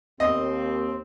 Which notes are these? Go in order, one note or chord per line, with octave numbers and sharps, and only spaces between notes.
D#2 C4 D#5